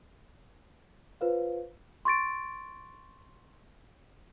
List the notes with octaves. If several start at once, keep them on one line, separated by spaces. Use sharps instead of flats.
F4 B4 C5 F5
C6 C#6 A6 D7